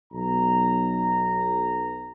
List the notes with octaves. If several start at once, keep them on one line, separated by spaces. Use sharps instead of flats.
B1 A#5